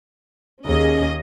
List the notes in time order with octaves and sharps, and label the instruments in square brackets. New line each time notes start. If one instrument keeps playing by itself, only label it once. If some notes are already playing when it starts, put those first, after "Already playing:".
[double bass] D#2 [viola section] C#4 G#4 D#5